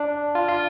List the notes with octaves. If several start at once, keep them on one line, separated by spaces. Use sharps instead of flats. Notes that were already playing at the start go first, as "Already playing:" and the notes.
Already playing: D4
F4
F4